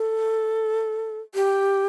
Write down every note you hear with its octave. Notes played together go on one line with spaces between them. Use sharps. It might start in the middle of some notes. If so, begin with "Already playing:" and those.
Already playing: A4
G4